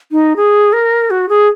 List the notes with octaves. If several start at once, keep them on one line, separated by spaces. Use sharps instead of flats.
D#4
G#4
A#4
F#4
G#4